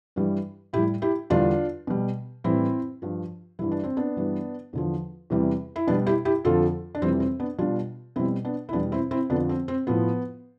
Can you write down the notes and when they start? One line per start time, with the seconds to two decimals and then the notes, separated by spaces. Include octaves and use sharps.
0.16 G2 E3 G3
0.73 A2 E4 G4
0.78 G3
1.02 E4 G4
1.30 E2 D3 G3 D4 F4
1.87 B2 G3
2.44 A2 E3 G3 C4 E4
3.02 G2 F3
3.59 G2 E3 G3 E4
3.72 D4
3.84 C4
3.97 B3 D4
4.16 G2 E3 G3
4.73 E2 D3 F3
5.30 E2 C3 E3 G3
5.76 E4
5.87 B2 G3 B3 D4
6.07 E4 G4
6.25 E4 G4
6.44 F2 D3 F3 F4 A4
6.95 D4
7.01 F2 C3 E3 G3 C4
7.20 C4
7.40 B3 D4
7.58 B2 G3 D4 F4
8.16 B2 G3 C4 E4
8.45 B3 D4
8.69 E4
8.73 E2 B2 G3 B3 D4
8.92 C4 E4
9.11 C4 E4
9.30 F2 D3 F3 B3 D4
9.49 C4
9.68 C4
9.87 A2 F3 B3